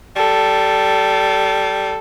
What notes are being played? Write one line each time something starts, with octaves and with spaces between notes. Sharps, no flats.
G3 A4